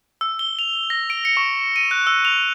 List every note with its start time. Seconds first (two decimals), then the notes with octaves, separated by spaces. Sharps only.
0.21 E6
0.39 G7
0.59 F7
0.90 A#6
1.10 D7
1.25 C#7
1.37 C#6
1.76 D#7
1.91 F#6
2.07 E6
2.25 F7